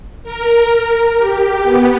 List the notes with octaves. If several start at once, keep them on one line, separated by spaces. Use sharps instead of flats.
A#4
A#4
G4
B3